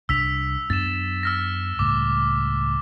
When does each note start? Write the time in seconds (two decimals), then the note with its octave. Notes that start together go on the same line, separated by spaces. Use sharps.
0.09 C2 D4 E6 B6 F7
0.70 F#2 B3 D4 A6 E7
1.23 E6 F6 A#6
1.79 C#2 A2 G3 D6